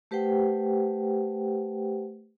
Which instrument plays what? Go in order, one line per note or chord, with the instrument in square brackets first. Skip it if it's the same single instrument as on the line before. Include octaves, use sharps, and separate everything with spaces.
[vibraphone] A3 G4 B4 C5 F#5 G5